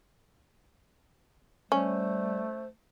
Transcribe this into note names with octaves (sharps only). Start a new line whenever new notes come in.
G3 A3 C#4 C5